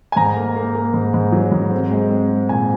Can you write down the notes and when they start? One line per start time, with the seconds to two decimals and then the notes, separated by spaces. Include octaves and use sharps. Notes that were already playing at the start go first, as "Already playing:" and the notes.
0.12 G#5
0.16 G#2 A#5
0.37 A#3
0.56 A#3
0.75 A#3
0.94 G#2
1.14 G#2
1.32 F#3
1.52 G#2
1.71 C4
1.91 G#3
2.10 C4
2.30 G#3
2.49 A#2 G#5